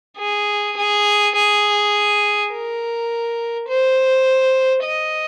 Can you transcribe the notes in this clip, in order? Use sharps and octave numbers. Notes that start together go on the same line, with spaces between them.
G#4
G#4
G#4
A#4
C5
D#5